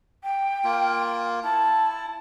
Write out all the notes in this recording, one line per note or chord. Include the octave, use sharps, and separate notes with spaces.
G5
A#3 F4
E4 A5